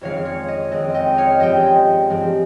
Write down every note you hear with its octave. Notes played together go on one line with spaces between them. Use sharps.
F2 D#3 G#3 C4 C#5 F5
C#5
D#5
F2 D#3 G#3 C4 D#5
D#5 G5
C#5 F5
G2 F3 G#3 C4 D#5 G5
G2 F3 G#3 C4